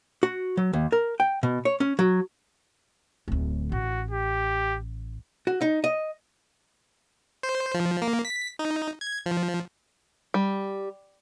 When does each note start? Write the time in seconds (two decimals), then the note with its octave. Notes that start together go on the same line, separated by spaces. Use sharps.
0.23 F#4
0.57 F#3
0.73 D#2
0.92 A#4
1.20 G5
1.43 B2
1.65 C#5
1.80 C#4
1.99 F#3
3.28 D1 D2
3.72 A1 F#4
4.11 G4
5.47 F#4
5.61 D#4
5.84 D#5
7.43 C5
7.74 F3
8.02 A#3
8.25 B6
8.59 D#4
9.01 G#6
9.26 F3
10.34 G3